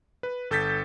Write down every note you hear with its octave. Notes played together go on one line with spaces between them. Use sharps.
B4
G1 A4 G6 A6 B6